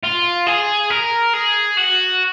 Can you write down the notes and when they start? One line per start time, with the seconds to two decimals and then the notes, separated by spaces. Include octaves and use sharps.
0.03 F4
0.47 G#4
0.90 A#4
1.34 G#4
1.77 F#4